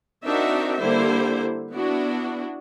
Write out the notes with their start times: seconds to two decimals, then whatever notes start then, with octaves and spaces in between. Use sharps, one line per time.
0.24 C4 D4 D#4 F#4 A#4 E5
0.81 D3 G3 A#3 E4 C5
1.73 B3 D4 E4 F#4